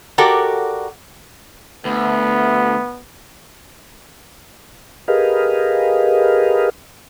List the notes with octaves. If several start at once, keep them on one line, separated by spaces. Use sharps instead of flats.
F#4 G4 A4 A#4 D5
D2 B3
G4 G#4 A#4 B4 D#5 F5